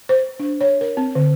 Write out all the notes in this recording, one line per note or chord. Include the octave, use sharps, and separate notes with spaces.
C5
D4
C#5
A#4
C4
D3